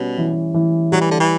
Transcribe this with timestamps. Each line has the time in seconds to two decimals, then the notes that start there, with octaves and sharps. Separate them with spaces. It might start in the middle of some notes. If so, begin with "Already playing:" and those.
Already playing: B2 G3 C#4
0.18 E3
0.54 E3
0.92 F#3 G3
1.01 E3
1.11 D3
1.20 E3